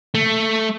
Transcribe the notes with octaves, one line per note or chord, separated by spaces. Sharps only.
A3